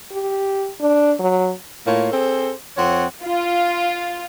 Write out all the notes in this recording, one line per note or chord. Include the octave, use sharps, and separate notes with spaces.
G4
D4
F#3
A2 A#3 F4 C#5
C4 G#4 A4 C5
F2 C4 C#5 F#5
F4